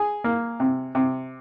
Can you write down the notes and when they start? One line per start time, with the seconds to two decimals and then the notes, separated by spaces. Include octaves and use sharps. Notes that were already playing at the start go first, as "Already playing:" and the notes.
Already playing: G#4
0.24 A#3
0.60 C3
0.95 C3